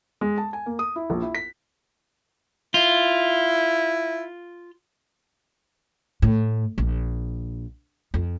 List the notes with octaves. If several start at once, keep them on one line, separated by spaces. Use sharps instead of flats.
G#3
A5
G#5
A#3
D#6
E4
A#1
E4
B6
E4 F4
A2
A#1
F2